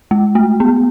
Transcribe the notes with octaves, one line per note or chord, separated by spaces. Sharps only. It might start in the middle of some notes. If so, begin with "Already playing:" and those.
G#3
A3
B3